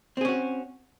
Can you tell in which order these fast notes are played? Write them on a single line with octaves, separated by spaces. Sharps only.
C4 G#4 C#4 F#4